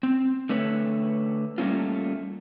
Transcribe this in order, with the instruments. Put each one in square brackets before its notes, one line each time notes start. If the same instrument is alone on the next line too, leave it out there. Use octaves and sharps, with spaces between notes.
[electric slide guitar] C4
D3 A3 B4 C#5
G3 A3 A#3 C#4 F4